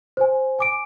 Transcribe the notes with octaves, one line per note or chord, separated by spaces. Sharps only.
C5 G#5
G#5 D6 D7